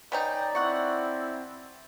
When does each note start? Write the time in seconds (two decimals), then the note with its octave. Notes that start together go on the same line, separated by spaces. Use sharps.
0.12 B3 C#4 D#4 D5 G5
0.55 C4 E4 F#5 C#6